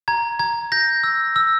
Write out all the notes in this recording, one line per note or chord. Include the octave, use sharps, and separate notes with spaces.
A#5 G#6
A#5 G#6
G6 A#6
E6
E6